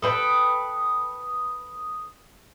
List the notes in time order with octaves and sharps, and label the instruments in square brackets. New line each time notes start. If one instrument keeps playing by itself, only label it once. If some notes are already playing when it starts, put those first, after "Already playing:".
[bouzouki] A4 B4 G5 [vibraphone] D#6